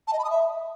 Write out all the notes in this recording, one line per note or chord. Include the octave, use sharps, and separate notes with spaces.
A5
D#5
B5
D#6
E5